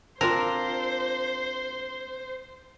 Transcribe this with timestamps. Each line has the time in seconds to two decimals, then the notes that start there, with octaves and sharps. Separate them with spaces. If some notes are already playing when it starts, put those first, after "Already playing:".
0.21 C4 D4 F4 A#4 C5